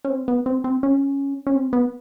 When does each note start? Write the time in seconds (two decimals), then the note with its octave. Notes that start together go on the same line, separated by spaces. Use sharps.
0.05 C#4
0.10 C4
0.28 B3
0.46 C4
0.64 C4
0.83 C#4
1.47 C#4
1.56 C4
1.73 B3